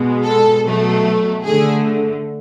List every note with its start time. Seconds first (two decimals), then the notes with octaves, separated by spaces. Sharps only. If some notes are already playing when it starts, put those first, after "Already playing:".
Already playing: B2 G#3
0.24 A4
0.64 B2 F#3 A3
1.45 D3 A3 G#4